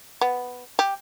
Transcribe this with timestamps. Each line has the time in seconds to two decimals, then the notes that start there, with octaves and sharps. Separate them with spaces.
0.21 B3
0.79 G4